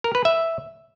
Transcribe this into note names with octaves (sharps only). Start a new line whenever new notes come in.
A#4
B4
E5